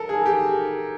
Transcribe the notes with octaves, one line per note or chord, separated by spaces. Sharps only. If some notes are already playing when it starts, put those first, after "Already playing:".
Already playing: A4 A#4
G#4
G4